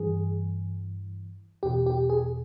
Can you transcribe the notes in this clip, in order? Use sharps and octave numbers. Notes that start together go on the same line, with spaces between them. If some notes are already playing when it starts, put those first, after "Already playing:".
Already playing: G2 E3 G#4
E2 B2 G4
G4
G#4